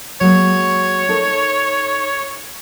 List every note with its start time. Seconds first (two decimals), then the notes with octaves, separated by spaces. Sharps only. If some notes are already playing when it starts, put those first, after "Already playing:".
0.21 F#3 G#3 A#3 C#5
1.09 D#4 A4 A#4